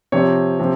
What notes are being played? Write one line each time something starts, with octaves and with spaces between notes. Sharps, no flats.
C3 F3 C#5
C3 F3